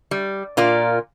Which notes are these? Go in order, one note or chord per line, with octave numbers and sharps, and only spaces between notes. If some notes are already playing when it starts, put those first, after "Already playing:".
G3
A#2 F4 A#4 D5